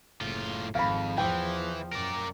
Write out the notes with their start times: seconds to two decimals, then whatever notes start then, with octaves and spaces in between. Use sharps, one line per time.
0.21 F#1 A2 F4
0.75 G#1 F2 F5 B5
1.18 E2 E3 F3 G5
1.93 F#2 A#4 D5